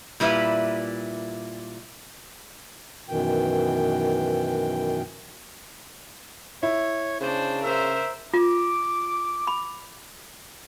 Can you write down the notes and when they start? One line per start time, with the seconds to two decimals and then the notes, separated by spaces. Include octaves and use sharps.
0.20 A#2 G3 E4 B4 E5
3.09 F#2 B2 D#3 E3 G5
6.63 E4 C#5
7.20 C#3 D4 C5
7.63 A#4 C5 E5
8.34 F4 D6
9.47 B5